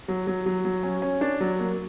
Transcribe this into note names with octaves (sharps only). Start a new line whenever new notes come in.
F#3
F#3
F#3
F#3
C#4
C#4
D4
F#3
A#3